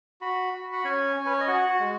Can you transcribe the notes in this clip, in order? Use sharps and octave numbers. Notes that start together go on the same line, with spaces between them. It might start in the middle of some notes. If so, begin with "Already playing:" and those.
F#4 B5
F#4
F#5
C#4 G#5
C#4
B4
C#5
D#5
F#4 F#5
F#4
G#3